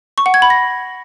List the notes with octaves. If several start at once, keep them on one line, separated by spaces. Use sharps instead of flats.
C#6
F#5
G#6
B5
A#6